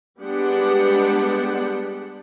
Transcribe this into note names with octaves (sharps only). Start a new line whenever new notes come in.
G3 G#3 B3 D4 G4 F#5